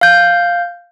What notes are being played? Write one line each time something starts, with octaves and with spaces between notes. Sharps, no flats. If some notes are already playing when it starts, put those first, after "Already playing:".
F5 G6